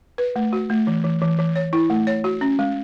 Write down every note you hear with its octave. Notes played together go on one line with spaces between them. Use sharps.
B4
A3
F#4
A3
E3
E3
E3
E3
C#5
E4
A3
C#5
F#4
C#4
G#3